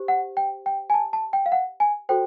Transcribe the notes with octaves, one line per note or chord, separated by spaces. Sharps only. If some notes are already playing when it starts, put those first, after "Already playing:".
Already playing: G4 C5
F#5
G5
G5
G#5
A5
A5
G5
F5
F#5
G#5
F#4 A4 C5 G5